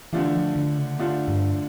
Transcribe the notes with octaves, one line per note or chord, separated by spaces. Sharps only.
D3 E3 A3 D4 F4
F3
D3
C#3
D3 A3 D4 F4
G2